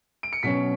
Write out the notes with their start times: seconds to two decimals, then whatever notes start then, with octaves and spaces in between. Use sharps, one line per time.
0.23 D7
0.33 C#7
0.43 B2 F#3 C#4 B6